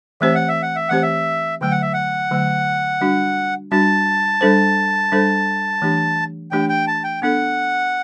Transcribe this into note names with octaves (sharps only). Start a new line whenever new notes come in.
E3 A3 C4 G4 C5 E5
F#5
E5
F#5
E5
E3 A3 C4 G4 C5 F#5
E5
D3 F#3 A3 G5
F#5
E5
F#5
D3 F#3 A3
G3 D4 F#4
G3 D4 F#4 A5
G3 D4 A4 C5
G3 D4 A4 C5
E3 A3 D4 G4
E3 A3 D4 G4 G5
G5
A5
G5
B3 D4 A4 F#5